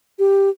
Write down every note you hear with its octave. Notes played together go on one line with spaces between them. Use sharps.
G4